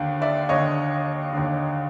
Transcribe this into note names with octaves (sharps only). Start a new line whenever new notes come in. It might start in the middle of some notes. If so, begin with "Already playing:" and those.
Already playing: D#2 D3
D5 E5
D#2 D3 C#5 D#5
D#2 D3